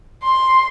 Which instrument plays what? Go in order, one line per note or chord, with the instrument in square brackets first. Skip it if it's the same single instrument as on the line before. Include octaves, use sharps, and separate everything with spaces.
[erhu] C6